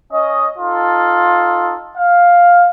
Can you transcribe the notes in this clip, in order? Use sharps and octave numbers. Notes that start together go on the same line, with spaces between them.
C#4 D#5
D#4 F4 A4
F5